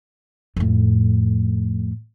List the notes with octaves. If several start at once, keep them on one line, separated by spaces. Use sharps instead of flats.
F2 A2